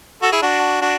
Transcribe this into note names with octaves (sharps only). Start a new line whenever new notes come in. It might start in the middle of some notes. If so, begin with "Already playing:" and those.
F#4 A4
E4 G#4
D4 F#4
D4 F#4